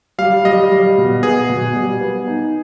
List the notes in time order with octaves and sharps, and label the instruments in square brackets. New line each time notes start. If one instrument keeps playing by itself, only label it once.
[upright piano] G3 [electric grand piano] F5
[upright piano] G3 [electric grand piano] D#5
[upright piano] G3
B2
[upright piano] B3 [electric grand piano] G#4
[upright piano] B2
G3
B3
D#4